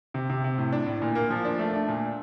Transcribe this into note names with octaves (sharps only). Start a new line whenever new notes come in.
C3
C3
C3
A2
D4
A2
A#2
A#3
F3
D4
A3
D4
A#2